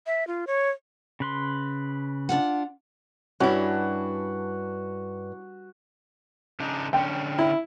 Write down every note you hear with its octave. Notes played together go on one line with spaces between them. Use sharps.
E5
F4
C#5
C#3 B4 C6
D4 F4 F#5
G2 C#4 D4 E4 F#4
C#3 D4 D#4
D3 C#4 G5
E4